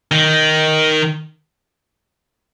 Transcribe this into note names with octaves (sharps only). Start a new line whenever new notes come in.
D#3